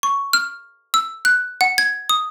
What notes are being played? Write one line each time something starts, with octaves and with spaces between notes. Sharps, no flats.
C#6
F6
E6
F#6
F#5
G#6
D#6